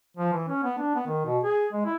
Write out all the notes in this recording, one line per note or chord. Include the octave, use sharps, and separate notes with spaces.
F3
E3
C#4
B3
D4
B3
D#3
B2
G#4
G#3
E4